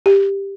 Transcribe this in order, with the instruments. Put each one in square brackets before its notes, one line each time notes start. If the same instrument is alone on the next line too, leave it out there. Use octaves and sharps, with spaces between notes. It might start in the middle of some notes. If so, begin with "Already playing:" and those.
[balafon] G4